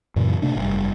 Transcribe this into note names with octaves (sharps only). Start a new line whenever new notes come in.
F#2 A#2 C#3 E3
A2 C3 A3 D4
F1 G2